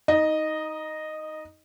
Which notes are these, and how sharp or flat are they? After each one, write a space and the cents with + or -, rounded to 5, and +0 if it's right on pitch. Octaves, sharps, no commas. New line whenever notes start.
D#4 +20 D#5 -10